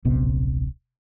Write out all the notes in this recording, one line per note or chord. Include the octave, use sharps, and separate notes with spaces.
D1 A#1 C3 B3